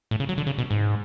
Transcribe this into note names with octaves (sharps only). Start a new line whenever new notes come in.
A2
C#3
F#3
D3
C#3
B2
G#2